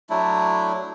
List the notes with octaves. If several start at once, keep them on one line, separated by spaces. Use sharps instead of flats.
F#3 A3 D4 E4